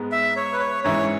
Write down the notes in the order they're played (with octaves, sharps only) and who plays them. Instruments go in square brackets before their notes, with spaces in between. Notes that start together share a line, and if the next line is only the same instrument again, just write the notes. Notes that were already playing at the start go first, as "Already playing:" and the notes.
Already playing: [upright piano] G#2 G#3 B3
[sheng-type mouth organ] E5
C#5
B4
C#5
[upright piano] G#2 E3 C#4 E4 [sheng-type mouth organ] C#5